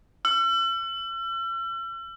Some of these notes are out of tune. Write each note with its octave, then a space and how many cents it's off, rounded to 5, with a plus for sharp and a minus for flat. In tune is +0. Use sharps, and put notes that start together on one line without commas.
E6 +45